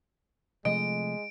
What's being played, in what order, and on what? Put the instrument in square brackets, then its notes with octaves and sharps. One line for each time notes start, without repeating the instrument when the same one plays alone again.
[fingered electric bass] C3 F3 A3 [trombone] G#3 [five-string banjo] D#5 [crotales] D7